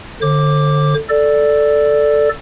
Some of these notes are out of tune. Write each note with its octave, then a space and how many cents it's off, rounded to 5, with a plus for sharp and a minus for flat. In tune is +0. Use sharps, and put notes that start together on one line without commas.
D3 +10 C5 +40 D6 +0
A4 +0 D5 +0